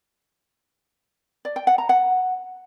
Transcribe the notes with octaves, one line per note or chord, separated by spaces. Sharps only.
D5
G5
F#5
A#5
F#5